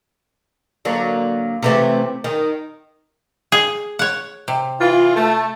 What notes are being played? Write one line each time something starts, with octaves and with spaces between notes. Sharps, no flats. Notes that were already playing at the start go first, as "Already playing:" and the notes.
D3 F#3 A#3
C3 E3 A3
D#3
G#4
C#5 F#5
C3
E3 E4 F4
A3